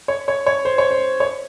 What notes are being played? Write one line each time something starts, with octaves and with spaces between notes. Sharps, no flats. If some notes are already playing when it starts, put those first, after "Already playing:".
C#5
C#5
C#5
C5
C#5
C5
C#5